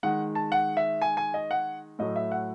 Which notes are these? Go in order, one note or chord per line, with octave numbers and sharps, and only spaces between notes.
D#3 G#3 F#5
A5
F#5
E5
G#5
G#5
D#5
F#5
A2 F#3 A3 D#5
E5
F#5